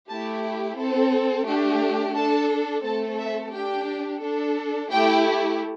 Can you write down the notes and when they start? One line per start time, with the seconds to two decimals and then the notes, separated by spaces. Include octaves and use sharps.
0.09 A3 E4 G4 A5
0.78 C4 A4
1.46 A3 D4 G4
2.15 D4 A4 A5
2.84 A3 C4 A4 A5
3.18 E5
3.53 D4 G4 G5
4.22 D4 A4
4.90 A3 E4 G4 G5